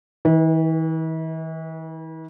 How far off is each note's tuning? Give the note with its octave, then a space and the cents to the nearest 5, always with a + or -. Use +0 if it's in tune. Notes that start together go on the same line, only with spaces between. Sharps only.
E3 -45 B4 +0